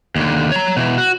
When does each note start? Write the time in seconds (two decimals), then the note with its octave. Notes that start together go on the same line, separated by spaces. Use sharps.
0.16 D#2 D3
0.52 C#5 A#5
0.76 B2 E3
0.98 F#4